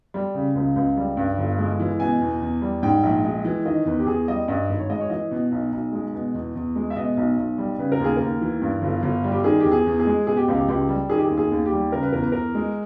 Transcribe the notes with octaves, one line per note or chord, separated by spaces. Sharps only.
G3
C#3
C#2
C#2
G3
G2
G1
G#3
E3
B2 G#5
E2
E2
G3
G#2 G5
A#1
G#3
E3
D#3 D#5
E2 B4
G4
E2 G#4
G3 D#5
G2 D#5
G#1
C#5
G#3 D#5
C#5
E3 D#5
B2
B1
B1
G#3
B2
E2
E2
G#3
E5
B2 D#5
B1
B1
G3
C#3 B4
A#4
D#2 G#4
D#2 A#4
E3
G2
G1
G1
G3
G4
D#3 G#4
E2 G4
G#4
E2
G#4
G#3
B2 G#4
G4
C#2
G4
C#2 G4
G3
D#3 G#4
G4
G#4
D#2
G#4
D#2
G4
G3
C#3 A#4
B4
E2 A#4
B4
E2 A#4
G#3